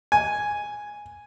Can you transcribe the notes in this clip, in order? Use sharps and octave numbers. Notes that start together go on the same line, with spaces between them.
G#5